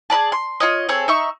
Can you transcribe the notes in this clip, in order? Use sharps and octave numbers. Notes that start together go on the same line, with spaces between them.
G#4 B4 D5 A5
C6
F4 C#5 D#5
C4 G#4 A4 C#5
D#4 E5 C#6